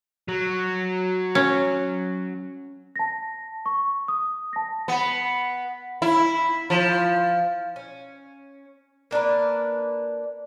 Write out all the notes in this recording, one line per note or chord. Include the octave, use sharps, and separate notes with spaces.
F#3
C#4
A5 A#6
C#6
D#6
A5 A#6
B3
E4
F3
C#4
A#3 D4 A#4 B4